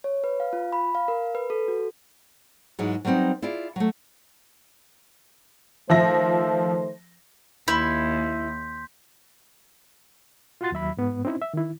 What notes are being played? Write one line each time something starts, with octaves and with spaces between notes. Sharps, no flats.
C#5
B4
F5
F4
B5
F5
A#4
B4
A4
F#4
G#2 E3 F#3 G#3
F#3 G3 B3 C4 D#4
E4 F4 G#4 D5
F#3 A3
D#3 F3 A3 C5 E5 A#6
D#2 E4 C6 G6 B6
F4 F#4 F#5 C6 A6
D#2 F#3 E5 B5
G#2 B3
C4 C#4 D#4 E4 C5
E5
D#3 E4